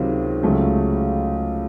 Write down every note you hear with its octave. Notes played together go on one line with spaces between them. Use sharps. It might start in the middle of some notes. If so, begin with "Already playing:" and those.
Already playing: C#2 C3 D#3 F#3
C#2 C#3 F#3 A3